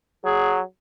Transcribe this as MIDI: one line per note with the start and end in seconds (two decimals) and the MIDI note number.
0.25 0.62 54
0.25 0.58 68